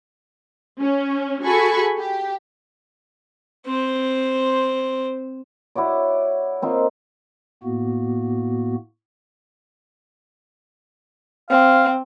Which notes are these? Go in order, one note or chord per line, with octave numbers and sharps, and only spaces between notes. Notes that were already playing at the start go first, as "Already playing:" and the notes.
C#4
F#4 G#4 A4 G#5 B5 C#6
G4
C4 C5
E4 F#4 C#5 D5
A#3 C4 D#4 F4
A2 A#3 B3 F#4
C4 F5